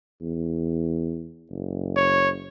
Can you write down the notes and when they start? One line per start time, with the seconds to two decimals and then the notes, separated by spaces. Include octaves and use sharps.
0.22 E2
1.51 F#1
1.96 C#5